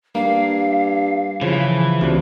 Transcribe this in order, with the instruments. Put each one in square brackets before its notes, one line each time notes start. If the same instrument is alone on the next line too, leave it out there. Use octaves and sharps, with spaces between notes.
[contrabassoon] G2 [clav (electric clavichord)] A#3 [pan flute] F5
[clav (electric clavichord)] C#3 F3 [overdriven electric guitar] E3
[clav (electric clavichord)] D2 F3 D4 [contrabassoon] C3